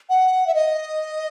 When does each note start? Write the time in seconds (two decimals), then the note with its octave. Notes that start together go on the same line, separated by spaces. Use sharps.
0.09 F#5
0.47 E5
0.54 D#5